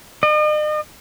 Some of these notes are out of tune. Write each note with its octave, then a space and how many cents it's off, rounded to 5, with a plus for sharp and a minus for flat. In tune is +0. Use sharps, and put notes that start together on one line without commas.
D#5 -40